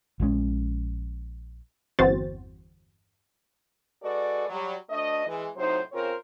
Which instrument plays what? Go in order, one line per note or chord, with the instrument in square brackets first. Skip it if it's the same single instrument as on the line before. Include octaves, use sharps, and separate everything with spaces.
[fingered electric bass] A#1 A#2 G#3 C#4
[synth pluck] G1 E2 C4 F#4 C5 A6
[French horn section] G#3 F#4 A4 B4 D5
F#3 G3
D2 A3 D4 D#5
E3 G#3
A2 C3 F#3 D#4 C5
C#3 C4 F4 A#4 C5 C#5